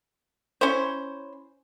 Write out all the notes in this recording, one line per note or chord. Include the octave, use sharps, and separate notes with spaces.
C#4 E4 C5